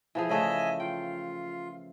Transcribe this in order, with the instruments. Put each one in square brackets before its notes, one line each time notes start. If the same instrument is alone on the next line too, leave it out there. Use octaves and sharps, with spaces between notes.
[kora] E3 F3 G#4
[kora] C#3 A3 [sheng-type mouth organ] D#5 E5 G#5
[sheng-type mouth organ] F4 [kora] G5